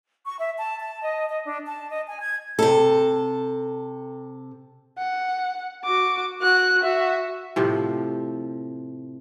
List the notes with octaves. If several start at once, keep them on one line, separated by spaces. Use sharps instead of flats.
C#6
E5
A5
A5
D#5
D#5
D4
A5
D#5
G#5
G#6
C3 A4
F#5
F#4 D6
F#4 F#6
F#4 E5
A2 C3 F3